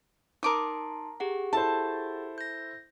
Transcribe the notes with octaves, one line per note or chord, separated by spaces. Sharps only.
D#4 A#4 A5 C6 D6 D#6
G4 G#4 F#5
E4 A4 C5 A5
G6 A#6